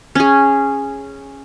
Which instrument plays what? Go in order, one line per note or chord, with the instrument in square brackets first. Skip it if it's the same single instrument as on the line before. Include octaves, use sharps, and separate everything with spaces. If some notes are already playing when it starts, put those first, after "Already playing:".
[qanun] C#4 G#4